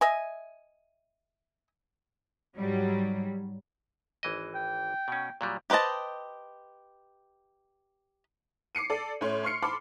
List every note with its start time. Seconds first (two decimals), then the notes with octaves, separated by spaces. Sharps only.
0.01 D#5 E5 G#5
2.57 G#2 F#3 G3
4.23 G#1 E3 D#5
4.55 G5
5.08 B2 C#4
5.41 A#2 F#3 G3
5.70 G4 B4 C5 D#5 A5
8.75 D6 C7 C#7 D#7
8.90 A4 D5
9.21 A2 C#4 C#5 C6
9.43 C6 C#6 F6 C7 C#7
9.63 A5 B5 C6 D6